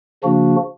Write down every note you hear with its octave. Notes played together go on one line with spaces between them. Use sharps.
C#3 F3 A#3 D4 F#4